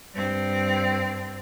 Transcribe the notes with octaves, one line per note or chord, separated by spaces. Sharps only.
G2 C4